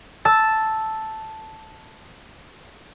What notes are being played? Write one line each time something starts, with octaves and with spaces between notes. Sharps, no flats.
A5 E6